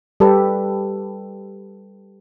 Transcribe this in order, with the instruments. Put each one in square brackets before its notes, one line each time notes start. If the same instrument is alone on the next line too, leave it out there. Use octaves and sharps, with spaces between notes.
[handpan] G3 G4 A4 B4